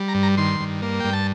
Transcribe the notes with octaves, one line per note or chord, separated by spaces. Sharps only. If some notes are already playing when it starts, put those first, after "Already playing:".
Already playing: G3
A#5
G2
A#5
D#3 C6
G2
A#3
G2 G5
A5